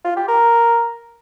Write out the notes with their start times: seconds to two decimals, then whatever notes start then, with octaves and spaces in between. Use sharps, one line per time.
0.04 F4
0.16 G4
0.28 A#4